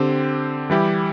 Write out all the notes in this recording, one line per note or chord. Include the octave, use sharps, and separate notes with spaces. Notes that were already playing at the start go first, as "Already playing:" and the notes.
Already playing: D3 C4 G4
E3 G3 E4 G4